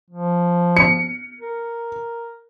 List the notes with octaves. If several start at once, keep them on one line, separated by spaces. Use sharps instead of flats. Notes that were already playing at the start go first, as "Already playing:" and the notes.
F3
C#7
A#4